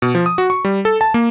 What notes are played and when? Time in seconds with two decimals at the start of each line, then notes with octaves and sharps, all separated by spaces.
0.02 B2
0.15 F3
0.26 D#6
0.38 F#4
0.50 C#6
0.65 G3
0.85 A4
1.01 A5
1.14 A#3